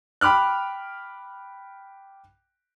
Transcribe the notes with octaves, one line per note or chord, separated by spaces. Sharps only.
G5 B5 D6 F6 F#6